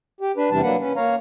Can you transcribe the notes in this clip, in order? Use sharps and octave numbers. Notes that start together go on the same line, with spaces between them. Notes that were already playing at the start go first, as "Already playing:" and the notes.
G4
D4 B4
E2 C3 E3 G3 D4 A5
F#3 A#3 D4 B4 F#5
C#4 B4
A#3 C#5 F5 A#5